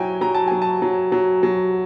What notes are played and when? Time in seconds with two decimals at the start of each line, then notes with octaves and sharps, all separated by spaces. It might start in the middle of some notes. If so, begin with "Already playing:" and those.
Already playing: F#3 E4 G5 G#5
0.21 F#3 A#5
0.35 A5
0.47 F#3 G#5
0.62 A5
0.82 F#3
1.12 F#3
1.43 F#3